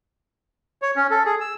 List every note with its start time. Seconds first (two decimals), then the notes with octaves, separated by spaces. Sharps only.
0.82 C#5
0.96 C#4
1.11 A4
1.25 G#4
1.41 E6